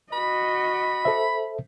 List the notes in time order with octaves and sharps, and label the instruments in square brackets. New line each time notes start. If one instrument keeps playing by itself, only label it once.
[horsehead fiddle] F#4 D#5 [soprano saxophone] B5
[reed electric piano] A4 C5 E5